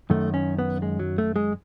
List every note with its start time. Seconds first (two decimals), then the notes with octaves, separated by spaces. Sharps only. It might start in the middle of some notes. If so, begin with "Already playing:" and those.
0.10 F#2 D#3 A3
0.34 C#4
0.59 B3
0.82 G#3
0.99 F#3
1.18 A3
1.36 G#3